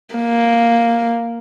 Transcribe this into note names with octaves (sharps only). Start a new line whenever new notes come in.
A#3